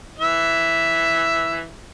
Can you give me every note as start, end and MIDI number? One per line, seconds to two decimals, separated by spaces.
0.18 1.68 52
0.18 1.68 76